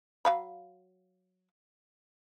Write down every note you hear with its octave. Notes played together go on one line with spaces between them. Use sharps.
F#3 F5 B5